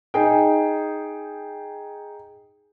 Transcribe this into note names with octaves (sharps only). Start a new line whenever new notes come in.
D#4 G#4 G5